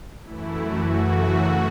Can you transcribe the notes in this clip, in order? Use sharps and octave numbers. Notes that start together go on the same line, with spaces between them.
F#2 E3 A3 E4
F#4
F#2 C#3 E3 A3